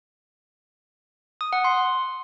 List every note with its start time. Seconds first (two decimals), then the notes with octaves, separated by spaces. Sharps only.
1.41 D#6
1.53 F#5
1.64 C6